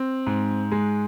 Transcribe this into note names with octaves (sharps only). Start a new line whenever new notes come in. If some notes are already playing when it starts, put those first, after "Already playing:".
Already playing: C4
G#2
G#3